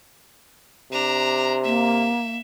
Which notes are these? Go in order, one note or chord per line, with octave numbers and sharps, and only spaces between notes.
C3 D4 A#5
A#3 E5